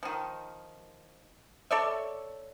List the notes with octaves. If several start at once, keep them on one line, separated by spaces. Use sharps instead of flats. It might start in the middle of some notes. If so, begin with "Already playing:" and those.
D#3 F3
A4 C#5 D5 E5